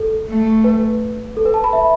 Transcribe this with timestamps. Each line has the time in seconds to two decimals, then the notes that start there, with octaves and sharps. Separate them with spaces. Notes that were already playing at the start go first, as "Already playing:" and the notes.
Already playing: A4
0.28 A3
0.64 B4
1.37 A4
1.45 B4
1.54 A5
1.64 B5
1.73 E5